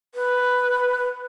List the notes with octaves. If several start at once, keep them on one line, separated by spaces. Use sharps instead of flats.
B4